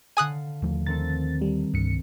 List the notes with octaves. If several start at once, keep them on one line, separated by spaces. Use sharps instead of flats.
D3 F5 G#5 D#6 F#6
D#2 F3 A3
D#3 C4 A4 A6
G3
C2 G2 C#7